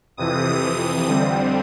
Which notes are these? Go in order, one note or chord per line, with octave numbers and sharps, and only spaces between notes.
F2 C3 E3 D#6
F2 D3 G3 C4